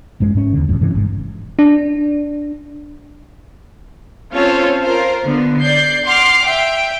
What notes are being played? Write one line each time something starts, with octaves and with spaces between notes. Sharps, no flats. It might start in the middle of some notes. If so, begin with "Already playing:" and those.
A1 F#2 G#3
G#2 C#4
D#2 D3
A#1 F2 G#2
G2 C3 E3 C#4
G1 G#2
D4
C4 C#4 F4 A4 C5 C#5
F4 A#4 C5
D3 B3
D5 G6 C7
F#5 C6 D6 F6 C7
E5 G5